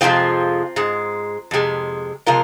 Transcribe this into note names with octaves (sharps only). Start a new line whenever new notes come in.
F2 C3 F3 G#3 C4 F4
G#2 G#3
F2 C3 G#3
C3 F3 G#3 F4 A#4